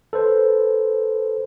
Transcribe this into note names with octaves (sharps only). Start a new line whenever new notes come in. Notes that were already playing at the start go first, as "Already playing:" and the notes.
A4 B4 C5